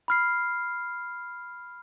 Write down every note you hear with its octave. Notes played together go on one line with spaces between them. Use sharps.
B5 F6 C7